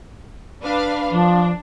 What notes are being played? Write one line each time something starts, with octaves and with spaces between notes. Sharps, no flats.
D4 B4 F5
F3 D4